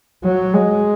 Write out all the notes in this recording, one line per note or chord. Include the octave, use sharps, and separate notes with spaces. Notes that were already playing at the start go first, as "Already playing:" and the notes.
F#3
G#3